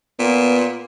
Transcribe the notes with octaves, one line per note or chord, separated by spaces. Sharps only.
A#2 B3